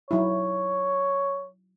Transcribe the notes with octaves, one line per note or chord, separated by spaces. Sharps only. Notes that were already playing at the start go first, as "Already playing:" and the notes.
F#3 D#4 E4 C#5